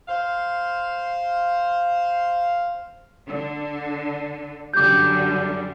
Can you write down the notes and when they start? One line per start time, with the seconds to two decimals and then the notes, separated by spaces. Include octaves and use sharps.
0.08 C5 F5
3.26 D3
4.74 F#2 D3 G3 D6 G6